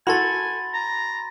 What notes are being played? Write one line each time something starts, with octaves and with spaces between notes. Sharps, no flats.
F#4 A4 G#5 B5 C6 A6
A#5